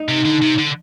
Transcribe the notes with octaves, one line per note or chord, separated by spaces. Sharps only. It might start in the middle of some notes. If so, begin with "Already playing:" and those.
Already playing: D#4
C3
D3
C3
D3